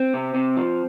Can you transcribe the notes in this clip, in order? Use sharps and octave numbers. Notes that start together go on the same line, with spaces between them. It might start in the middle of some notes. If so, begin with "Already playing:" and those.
Already playing: C4
C3
C3
F3